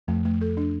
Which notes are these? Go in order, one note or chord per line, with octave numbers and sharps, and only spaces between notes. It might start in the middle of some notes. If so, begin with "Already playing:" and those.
F2 F3 A3
A3
A4
D4